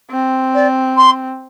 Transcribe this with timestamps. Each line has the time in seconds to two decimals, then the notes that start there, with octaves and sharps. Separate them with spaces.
0.10 C4
0.54 D5
0.97 C6